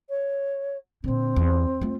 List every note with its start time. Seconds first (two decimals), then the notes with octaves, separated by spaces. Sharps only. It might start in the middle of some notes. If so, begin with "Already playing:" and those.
0.10 C#5
1.04 A#2 D3 C4
1.36 E2
1.81 A3 F4